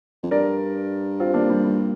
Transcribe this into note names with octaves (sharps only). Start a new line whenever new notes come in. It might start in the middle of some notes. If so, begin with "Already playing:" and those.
F2
G2 A#4 D5
C4 F4
A#3 D4
G3
G3